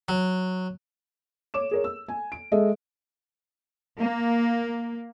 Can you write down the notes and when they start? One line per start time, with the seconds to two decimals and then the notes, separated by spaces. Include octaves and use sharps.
0.09 F#3
1.54 C#5 D6 E7
1.71 G#4 A#4 C#5
1.84 E6
2.08 G#5
2.32 D7
2.52 G#3 G#4 A4 D#5 E5
3.98 A#3